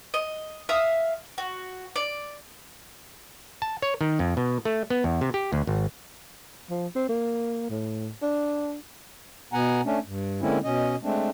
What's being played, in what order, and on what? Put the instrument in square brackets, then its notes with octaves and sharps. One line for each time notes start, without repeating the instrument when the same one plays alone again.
[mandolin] D#5
E5 F5 D#6
F#4
D5
[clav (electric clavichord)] A5
C#5
D#3
F2
B2
A3
B3
E2
C3
G4
D2
G#1
[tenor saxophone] F3
C4
A#3
A2
D4
[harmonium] B2 B3 F#5 G#5 A#5
A3 C#4 D4
G2
D3 G#3 A#3 C4 C#4 E4
B2 C#4 D#5
G#3 A3 C4 D4